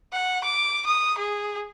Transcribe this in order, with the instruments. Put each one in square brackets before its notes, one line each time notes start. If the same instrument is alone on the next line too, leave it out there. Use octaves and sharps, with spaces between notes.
[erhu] F#5
D6
D#6
G#4